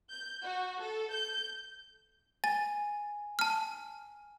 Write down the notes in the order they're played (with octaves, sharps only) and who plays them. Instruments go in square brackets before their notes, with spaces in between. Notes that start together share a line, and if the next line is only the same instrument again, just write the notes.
[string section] G6
F#4
A4
G6
[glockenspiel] G#5 [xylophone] A6
[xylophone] A5 F6